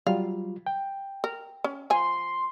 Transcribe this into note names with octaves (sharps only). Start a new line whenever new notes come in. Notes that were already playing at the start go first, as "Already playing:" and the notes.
F#3 G3 F4 F5
G5
A#4
C#4
F3 G#5 C6